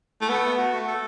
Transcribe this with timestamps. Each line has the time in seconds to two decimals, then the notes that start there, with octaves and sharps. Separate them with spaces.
0.21 A3
0.29 B3 A4
0.45 A3
0.58 F#4
0.73 A3
0.87 A4